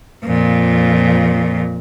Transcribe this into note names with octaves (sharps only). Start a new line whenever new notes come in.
F2 A#2